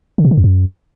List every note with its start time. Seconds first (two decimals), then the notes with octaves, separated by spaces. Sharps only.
0.18 D3
0.25 B2
0.31 D3
0.37 F2
0.44 F#2